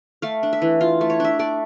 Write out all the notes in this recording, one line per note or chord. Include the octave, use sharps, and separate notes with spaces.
A3 F5
D4
E5
E3
F4 F5
A3
C#5
D4 E5
A3 D5